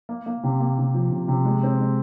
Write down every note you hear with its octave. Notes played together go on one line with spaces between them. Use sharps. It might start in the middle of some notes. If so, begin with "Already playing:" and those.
A#3
A#3
C3
A#3
C3
F3
C3
C3
G#3
C4
G#3